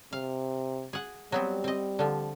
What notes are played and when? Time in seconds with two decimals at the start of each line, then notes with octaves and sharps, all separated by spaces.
0.13 C3 F5
0.93 G#4 F#5
1.32 F#3 G3 B3 C4
1.64 C4 D#5
1.99 D3 F3